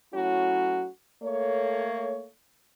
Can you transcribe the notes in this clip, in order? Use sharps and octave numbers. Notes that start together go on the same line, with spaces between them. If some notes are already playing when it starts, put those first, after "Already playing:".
F#3 A3 C#4 E4 F#4
A3 A#3 A4 C#5